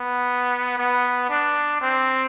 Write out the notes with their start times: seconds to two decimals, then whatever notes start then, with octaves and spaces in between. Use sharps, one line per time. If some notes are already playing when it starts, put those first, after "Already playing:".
Already playing: B3
0.78 B3
1.29 D4
1.81 C4